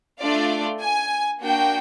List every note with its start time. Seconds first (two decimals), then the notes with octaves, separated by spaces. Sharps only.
0.20 A3 D4 F4 D5
0.81 G#5
1.42 A#3 D4 F#4 G5